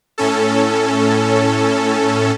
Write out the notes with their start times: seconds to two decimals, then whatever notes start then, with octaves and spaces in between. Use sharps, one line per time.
0.18 A2 C#4 A4